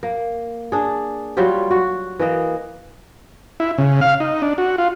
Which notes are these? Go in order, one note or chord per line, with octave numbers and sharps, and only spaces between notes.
A#3
D4 G#4
F#3 G3 F4 G4
F#4
E3 A#3 D#5
E4
C#3
F5
D#4
D4
F#4
F4